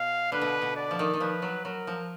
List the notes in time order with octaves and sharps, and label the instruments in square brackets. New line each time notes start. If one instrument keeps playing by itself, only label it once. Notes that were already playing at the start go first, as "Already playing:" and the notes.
Already playing: [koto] B2 [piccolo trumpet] F5
[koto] D3 [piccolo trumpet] B4
[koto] B2
B2
[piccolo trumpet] D5
[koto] F3
D#3
D#3
[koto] F3 [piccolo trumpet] B4
[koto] F#3
[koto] F#3 [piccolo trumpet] A#4
[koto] F3